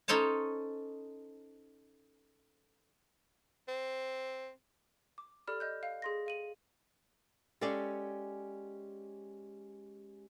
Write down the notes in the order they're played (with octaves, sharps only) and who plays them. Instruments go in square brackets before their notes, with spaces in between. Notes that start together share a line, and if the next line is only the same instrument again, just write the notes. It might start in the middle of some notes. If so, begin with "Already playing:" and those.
[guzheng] C#4 D#4 A4 C5 C#5 A5
[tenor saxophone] C4
[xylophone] D6
G4 A4 D5 B5 F6
D#5 F#6 G6
F5
G#4 C6 A#6
F5 D#7 F#7
[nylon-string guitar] G#3 C#4 G4 A4 D5 F5